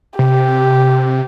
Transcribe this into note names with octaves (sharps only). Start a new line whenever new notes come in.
C3 G4